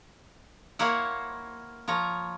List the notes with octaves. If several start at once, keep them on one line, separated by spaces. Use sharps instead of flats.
A#3 E4 C5 C#5 F5 F#5
F3 C#5 A#5